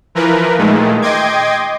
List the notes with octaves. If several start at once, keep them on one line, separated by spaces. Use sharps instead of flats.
E3 F3 A#4 B4
A#2 D#3 G#3 A3
D#5 G5 C6 D6 G#6